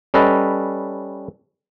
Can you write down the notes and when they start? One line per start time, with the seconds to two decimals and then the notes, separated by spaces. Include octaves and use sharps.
0.14 G3 C#4 A4 B4 D#5